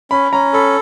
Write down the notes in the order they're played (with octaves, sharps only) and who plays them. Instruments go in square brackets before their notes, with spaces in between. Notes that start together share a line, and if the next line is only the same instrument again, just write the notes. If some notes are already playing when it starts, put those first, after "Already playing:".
[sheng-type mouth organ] C#4 [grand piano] B5
[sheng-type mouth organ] C#4 [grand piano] A#5
[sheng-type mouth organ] A4 [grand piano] B5